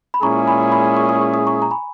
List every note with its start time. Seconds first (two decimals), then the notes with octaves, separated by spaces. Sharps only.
0.14 B5
0.22 A#2 G#3 C#4 E4 G#4 A#5 C#6
0.48 G#5 B5
0.72 B5 D#6
0.97 C#6
1.09 D#6
1.21 C#6
1.34 D#6
1.46 A#5 C#6
1.62 A#5
1.71 G#5 B5